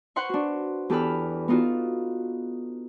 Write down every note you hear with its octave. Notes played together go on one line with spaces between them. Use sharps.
B4 C5 F#5 C6 C#6
D4 F#4
E2 G4 A4 B4 B5 F6
B3 D#4 F4 F#4